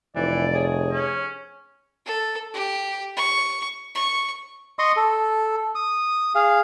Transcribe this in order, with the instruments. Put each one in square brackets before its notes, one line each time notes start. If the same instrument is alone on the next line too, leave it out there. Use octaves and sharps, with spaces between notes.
[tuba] F1 [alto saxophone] E3 [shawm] D5
[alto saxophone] G#4 [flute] C#5
[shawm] C#4
[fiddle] A4
G4
C#6
C#6
[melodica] D#5 C6 C#6 D#6
A4
D#6
G#4 F5